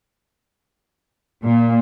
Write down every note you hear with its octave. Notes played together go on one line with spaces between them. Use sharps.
A#2